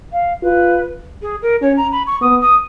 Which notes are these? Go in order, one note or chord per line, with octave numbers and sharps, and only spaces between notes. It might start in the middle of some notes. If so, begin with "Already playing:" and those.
F5
F4 B4
G#4
A#4
C#4 C#5
A#5
B5
C#6
B3 D#6
D#6